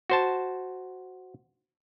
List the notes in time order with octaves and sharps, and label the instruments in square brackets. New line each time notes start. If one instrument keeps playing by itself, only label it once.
[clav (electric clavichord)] F#4 C5 A5